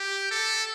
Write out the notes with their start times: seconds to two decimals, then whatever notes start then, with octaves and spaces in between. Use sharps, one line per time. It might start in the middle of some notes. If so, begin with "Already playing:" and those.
Already playing: G4
0.31 A4